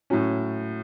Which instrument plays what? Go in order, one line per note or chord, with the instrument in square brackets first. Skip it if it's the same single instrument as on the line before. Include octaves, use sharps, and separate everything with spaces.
[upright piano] A2 F#3 C#4